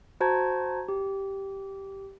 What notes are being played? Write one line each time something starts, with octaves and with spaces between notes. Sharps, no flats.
F#4 C5 A5 A#5 G#6
G4